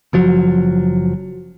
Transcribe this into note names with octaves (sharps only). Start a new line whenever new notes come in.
F#1 F3 F#3